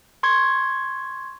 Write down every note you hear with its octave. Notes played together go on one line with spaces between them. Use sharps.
C6 C#6 G#6